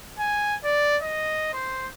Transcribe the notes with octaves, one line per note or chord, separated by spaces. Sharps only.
G#5
D5
D#5
C5